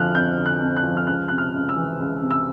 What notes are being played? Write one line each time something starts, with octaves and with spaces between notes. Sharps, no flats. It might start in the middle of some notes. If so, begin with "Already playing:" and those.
Already playing: F2 D3 F3 F6 F#6
F2 G6
D3
F#6
F2
F#6
F3
F6
C#2 F#6
C3 F#6
F6
C#2
E6
E3
C#2
C3
E6